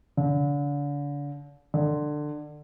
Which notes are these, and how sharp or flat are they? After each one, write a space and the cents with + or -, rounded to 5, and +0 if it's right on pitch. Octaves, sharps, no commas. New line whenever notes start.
D3 -35
D3 +20